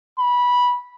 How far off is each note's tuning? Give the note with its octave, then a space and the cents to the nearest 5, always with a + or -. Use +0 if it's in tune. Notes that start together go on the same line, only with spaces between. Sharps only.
B5 -15